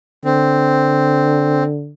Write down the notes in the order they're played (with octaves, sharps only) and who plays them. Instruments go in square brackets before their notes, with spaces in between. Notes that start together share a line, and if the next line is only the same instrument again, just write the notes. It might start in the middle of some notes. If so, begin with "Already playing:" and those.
[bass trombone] D3 [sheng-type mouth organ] C4